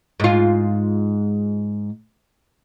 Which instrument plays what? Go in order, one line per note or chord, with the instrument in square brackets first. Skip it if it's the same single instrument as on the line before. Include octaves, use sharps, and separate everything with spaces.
[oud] G#2 F4